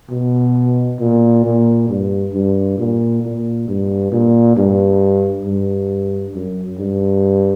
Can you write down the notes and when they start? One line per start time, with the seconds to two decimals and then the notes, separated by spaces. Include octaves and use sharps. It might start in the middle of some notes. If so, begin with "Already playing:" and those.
0.10 B2
1.00 A#2
1.44 A#2
1.89 G2
2.34 G2
2.78 A#2
3.23 A#2
3.68 G2
4.12 A#2
4.57 G2
5.45 G2
6.35 F#2
6.79 G2